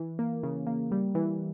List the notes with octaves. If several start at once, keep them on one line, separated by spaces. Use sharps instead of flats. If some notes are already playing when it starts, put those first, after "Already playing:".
Already playing: E3
A#3
C#3
A#3
G3
E3